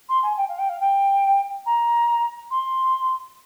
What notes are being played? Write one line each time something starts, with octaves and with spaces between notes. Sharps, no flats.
C6
G#5
G5
F5
G5
F5
G5
A#5
C6